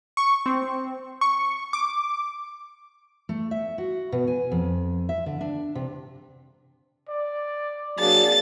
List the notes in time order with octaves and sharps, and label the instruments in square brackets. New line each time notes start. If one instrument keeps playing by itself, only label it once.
[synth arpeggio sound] C#6
C4
C#6
D6
[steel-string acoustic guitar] A3
E5
F#4
B2
G#5
F2
E5
D3
D4
C3
[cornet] D5
[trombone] F#3 [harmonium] A#3 G#4 D5 [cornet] D4 [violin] A6